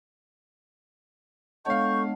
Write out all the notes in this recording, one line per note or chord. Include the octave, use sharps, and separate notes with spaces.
G#3 B3 D4 A4 C#5 F5 C#6 G6